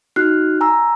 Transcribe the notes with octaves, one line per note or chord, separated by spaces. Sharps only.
D#4 F#4 F6 F#6 C7
G#5 A#5 E6